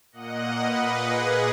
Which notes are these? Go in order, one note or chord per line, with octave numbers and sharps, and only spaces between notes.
A#2 A#3 D#5 F#5
B4 D#5
G#4 B4